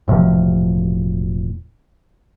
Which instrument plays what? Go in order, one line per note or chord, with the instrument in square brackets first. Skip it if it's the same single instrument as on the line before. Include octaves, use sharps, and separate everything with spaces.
[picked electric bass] E1 A2 C3 F3